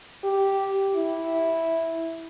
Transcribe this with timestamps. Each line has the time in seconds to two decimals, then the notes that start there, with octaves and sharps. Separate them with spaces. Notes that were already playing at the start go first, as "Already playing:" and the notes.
0.24 G4
0.95 E4